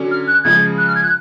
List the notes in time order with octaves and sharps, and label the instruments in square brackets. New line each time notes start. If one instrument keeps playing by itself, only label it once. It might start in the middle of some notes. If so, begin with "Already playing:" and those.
Already playing: [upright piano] D3 F#3 C#4
[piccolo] F6
F#6
[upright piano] C#3 F3 G#3 [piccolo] G#6
[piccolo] F#6
F6
G#6
F#6